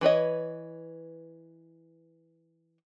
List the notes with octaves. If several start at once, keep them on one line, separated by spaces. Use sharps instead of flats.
E3 B4 C#5 D#5